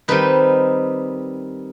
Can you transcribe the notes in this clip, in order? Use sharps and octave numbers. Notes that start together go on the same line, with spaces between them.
D#3 G3 C4 D#4 B4